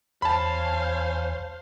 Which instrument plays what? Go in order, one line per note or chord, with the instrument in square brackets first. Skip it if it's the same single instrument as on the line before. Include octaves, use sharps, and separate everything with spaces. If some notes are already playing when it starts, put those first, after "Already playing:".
[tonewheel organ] E2 C#5 G#5 [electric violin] C5 F5 [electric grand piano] A5 B5